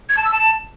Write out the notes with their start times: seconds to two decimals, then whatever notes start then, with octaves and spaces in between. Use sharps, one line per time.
0.09 G#6
0.17 A5
0.25 E6
0.32 A5